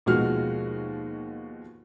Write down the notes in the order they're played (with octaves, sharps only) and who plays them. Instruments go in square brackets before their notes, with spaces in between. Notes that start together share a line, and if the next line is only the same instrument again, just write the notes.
[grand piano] D#2 B2 F3 G#3 F#4 F6